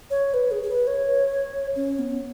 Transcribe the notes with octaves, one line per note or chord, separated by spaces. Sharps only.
C#5
B4
G#4
G#4
B4
C#5
C#4
B3